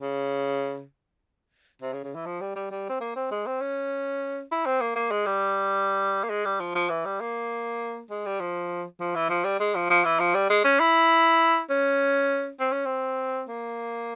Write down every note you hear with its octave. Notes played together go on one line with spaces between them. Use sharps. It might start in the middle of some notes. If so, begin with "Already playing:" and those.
C#3
C3
C#3
C#3
E3
F3
G3
G3
G3
C4
A#3
C4
G#3
C4
C#4
E4
C4
A#3
A#3
G#3
G3
A#3
G#3
G3
F3
F3
E3
G3
A#3
G#3
G3
F3
F3
E3
F3
G3
G#3
F3
F3
E3
F3
G3
G#3
C#4
E4
C#4
C4
C#4
C4
A#3